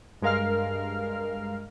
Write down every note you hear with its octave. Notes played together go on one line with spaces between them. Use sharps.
G2 G#3 A#4 F5 F6